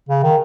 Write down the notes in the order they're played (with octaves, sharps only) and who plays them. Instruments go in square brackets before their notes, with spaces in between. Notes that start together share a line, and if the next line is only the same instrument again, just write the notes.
[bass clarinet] C#3
D#3